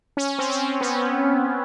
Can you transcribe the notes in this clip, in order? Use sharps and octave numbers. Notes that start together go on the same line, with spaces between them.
C#4
C4
C#4
B3